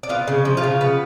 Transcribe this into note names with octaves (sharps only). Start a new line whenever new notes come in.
D5
B3 F4 F5
C#3
F3
F4 F5
C#3
B3